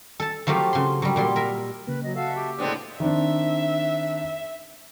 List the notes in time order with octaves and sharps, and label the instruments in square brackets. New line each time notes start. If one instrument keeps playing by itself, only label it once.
[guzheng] A4 A5
F3 F#3 A3 G4 F5
C#3 C6
F#3 G3
A#2 G3 C6
A#4 E5
[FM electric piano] C#3 A#3 [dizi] B4
[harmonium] F#3 [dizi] D#5
[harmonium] F#4 A4 E5 [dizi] F5
[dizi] G4
[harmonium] A2 G#3 D5 [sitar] D3 B3 C4
[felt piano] D#3 C4 D4 [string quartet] E5